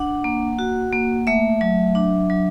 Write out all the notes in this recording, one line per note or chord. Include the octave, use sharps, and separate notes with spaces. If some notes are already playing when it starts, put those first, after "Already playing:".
Already playing: D4 F#5
A#3
F#4
A#3
A3 E5
F#3
D4
F#3